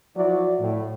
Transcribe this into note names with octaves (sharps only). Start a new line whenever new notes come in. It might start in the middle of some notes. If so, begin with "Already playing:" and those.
F3 F#3 E4 F#4 D5
A2